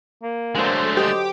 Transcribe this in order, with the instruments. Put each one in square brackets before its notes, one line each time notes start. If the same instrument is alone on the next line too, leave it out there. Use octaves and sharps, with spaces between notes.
[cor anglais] A#3
[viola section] D3 F#3 C5 [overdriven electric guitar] G#3 A3
[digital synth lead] G4 [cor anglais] D#5